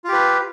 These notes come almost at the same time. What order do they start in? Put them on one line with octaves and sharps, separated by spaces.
F4 G4 B4